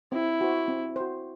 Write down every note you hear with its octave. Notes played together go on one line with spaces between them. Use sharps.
C4 E4
F#4 C5
C4
F#4 C5